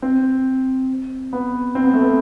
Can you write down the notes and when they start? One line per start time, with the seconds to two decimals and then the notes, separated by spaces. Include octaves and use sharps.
0.02 C4
1.33 B3
1.75 C4
1.84 B3
1.94 A3
2.02 B3